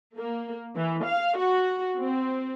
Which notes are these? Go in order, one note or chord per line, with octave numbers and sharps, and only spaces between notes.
A#3
E3
F5
F#4
C4